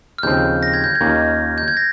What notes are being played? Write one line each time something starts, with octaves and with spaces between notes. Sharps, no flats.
F6
D#2 C#3 F3 C4 G6
A#6
G#6
G6
G#6
D#2 D#3 A#3 C#4 F4
G6
G#6
A#6